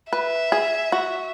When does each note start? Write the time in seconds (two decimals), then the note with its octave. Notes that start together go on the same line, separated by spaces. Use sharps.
0.13 B4 E5
0.52 G#4
0.92 F#4